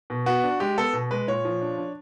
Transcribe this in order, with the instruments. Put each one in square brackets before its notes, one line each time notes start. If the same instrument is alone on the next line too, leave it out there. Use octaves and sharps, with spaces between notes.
[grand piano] B2
B3 F#4
D4
G#3 G4
B3 A4
B2
G#3 B4
A#2 C#5
F3
D4
D4